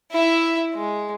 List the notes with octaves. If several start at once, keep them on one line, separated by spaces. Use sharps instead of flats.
E4 E5
G#3